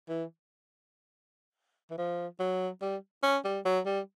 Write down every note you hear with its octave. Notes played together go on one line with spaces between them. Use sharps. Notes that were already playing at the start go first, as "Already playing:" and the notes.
E3
E3
F3
F#3
G3
C#4
G3
F#3
G3